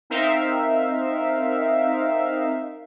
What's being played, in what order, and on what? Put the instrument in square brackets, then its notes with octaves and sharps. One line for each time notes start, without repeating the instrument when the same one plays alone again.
[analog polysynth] C4 D#4 A#4 E5 F5